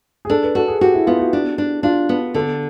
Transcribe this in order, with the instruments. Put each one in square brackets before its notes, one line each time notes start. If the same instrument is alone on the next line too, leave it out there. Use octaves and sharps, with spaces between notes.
[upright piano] G#4
[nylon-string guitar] D4 [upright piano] A4
[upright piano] B4
[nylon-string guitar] F#4 [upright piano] A4
[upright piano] G#4
[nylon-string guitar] F#4 [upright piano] G4
[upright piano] E4
[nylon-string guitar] B3 [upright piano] F4
[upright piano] F#4
[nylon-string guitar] D4
D4
[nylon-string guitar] D4 [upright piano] F4
[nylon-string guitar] B3
[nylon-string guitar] D3 [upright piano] A4